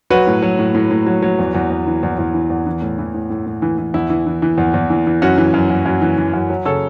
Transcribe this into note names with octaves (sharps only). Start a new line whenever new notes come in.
F#3 F#4 B4
A2
F#3
A2
A2
A2
F#3
F#3
E2
E2
E2
E3
E2
E2
E3
E2
E3
A2
E3
A2
A2
A2
E3
E3
E2 E4
E3
E3
E3
E2
E2
E3
E3
F#2 C#4 F#4
E3
F#2
F#2
F#2
E3
E3
F#2
F#3
C#3 A4 C#5